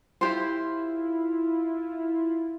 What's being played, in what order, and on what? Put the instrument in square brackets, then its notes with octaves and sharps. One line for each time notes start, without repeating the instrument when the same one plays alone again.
[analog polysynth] E4 F4 [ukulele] G4 C5